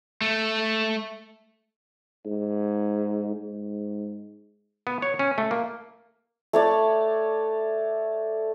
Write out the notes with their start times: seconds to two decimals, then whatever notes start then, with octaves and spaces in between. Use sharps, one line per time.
0.21 A3
2.26 G#2
3.36 G#2
4.87 B3
5.02 C#5
5.19 C#4
5.38 A3
5.51 A#3
6.53 A3 C#5 D5